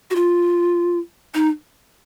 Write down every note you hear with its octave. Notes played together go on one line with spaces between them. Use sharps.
F#4
F4
D#4